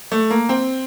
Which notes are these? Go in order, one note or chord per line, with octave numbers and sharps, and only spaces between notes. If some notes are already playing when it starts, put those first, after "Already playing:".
A3
A#3
C4